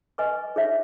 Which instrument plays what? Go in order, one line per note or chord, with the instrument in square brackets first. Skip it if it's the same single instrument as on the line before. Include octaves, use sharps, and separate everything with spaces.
[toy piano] B4 D#5 G#5 C#6
D#4 G#4 C#5 E5